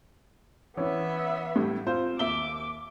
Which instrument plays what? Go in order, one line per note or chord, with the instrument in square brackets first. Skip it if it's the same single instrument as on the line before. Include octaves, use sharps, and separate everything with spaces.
[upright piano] E3 C#4 [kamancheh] B3 E5
[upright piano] A2 G3
C4 F4 C5
[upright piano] D#2 E5 G7 [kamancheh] D6